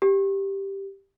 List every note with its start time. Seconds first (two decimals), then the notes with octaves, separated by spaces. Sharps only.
0.02 G4